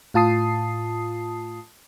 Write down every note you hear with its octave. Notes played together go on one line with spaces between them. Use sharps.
A2 F4 A5 D#6 C7